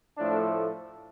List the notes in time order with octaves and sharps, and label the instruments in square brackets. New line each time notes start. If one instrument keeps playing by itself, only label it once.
[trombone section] A2 F3 A3 D4